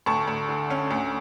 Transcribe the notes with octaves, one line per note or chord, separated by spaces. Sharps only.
D2 A5 C#6
D2
D3
C#4
D2